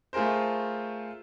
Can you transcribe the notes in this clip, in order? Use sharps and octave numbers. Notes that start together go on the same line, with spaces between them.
A3 F4 G#4 A#4 C5